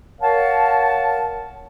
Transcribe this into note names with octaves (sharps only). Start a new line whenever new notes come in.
A#4 C#5 F5 F#5 A5